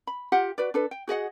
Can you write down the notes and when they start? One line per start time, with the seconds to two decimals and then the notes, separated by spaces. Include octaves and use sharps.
0.07 B5
0.32 F4 G4 F#5
0.58 F#4 B4 D5
0.74 D4 A4 B4
0.91 G5
1.08 F#4 G#4 D#5 F#5